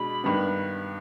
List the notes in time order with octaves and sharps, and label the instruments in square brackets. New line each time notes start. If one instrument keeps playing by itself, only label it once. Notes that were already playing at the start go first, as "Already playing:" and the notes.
Already playing: [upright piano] B2 G#3 D4 [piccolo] B5
[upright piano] G2 D#3 B3